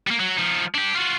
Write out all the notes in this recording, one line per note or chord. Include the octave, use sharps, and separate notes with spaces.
G3 A#3
F#3
F3 D#4
D4 G4
F4 F#4